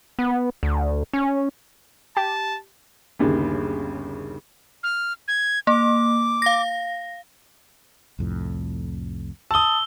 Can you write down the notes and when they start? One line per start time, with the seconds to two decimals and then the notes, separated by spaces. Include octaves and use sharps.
0.19 B3
0.63 D2
1.13 C#4
2.17 G4 A5
3.19 G1 D#2 C#3
4.83 F6
5.28 G#6
5.67 A#3 D6
6.42 F5 A#6
8.19 C2 F2 A2
9.51 A5 D#6 E6 G7